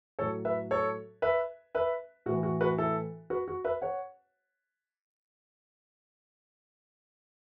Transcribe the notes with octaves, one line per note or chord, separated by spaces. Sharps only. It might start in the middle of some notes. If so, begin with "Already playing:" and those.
A2 F#3 A4 C#5
B4 E5
A4 C#5
B4 E5
B4 E5
A2 E3 F#4
F#4
F#4 B4
E4 A4
F#4 B4
F#4
B4 E5
C#5 F#5